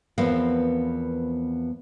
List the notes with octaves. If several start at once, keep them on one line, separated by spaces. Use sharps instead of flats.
E2 F3 B3 C4 A#4 F5